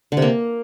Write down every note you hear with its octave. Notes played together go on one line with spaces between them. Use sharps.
D3
C3
A#3